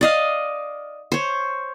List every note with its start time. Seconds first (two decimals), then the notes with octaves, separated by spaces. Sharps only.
0.01 D5 D#5 F5
1.12 C5 C#5